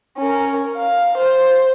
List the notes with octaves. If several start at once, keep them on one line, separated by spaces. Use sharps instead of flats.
C#4 A#4
F5
C5